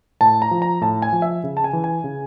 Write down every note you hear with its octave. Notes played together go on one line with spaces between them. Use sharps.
A2 A5
A#5
F3
A#5
A2 A5
G#5
F3
E5
C#3
A5
G#5
E3
G#5
C#3